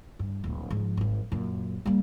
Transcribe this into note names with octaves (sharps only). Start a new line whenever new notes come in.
G2
D1 A#1
G#2 F3
G#1 F#3
F#2 A#2
G3 A#3